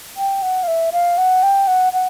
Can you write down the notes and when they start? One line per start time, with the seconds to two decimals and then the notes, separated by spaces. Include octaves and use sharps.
0.17 G5
0.42 F#5
0.63 F5
0.68 E5
0.92 F5
1.18 F#5
1.43 G5
1.67 F#5
1.93 F#5